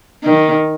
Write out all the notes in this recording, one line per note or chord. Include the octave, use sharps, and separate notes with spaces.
D#3